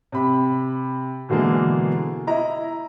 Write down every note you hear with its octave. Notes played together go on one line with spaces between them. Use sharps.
C3 B5
B2 D3 E3 G#3 A#3
E4 D#5 A#5